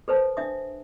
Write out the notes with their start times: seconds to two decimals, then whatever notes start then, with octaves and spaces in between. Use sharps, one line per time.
0.08 A4 B4 C5 A5
0.37 D4 E5 D#6